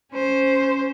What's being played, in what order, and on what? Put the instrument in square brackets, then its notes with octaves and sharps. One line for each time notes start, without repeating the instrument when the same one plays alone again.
[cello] C#4 C5